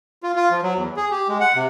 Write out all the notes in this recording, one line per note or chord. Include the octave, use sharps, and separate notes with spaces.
F4
F4
F3
F#3
E2
G#4
G4
G#3
F#5
C3